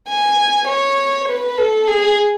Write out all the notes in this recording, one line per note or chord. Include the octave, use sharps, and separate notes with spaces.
G#5
C#5
B4
A4
G#4